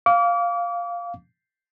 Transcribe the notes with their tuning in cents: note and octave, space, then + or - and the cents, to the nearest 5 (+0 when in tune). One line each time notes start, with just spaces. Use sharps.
F5 +0 D6 -35